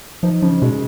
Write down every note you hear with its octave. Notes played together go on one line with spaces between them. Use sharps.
F3 D#4
C#3 F3
B2 G#3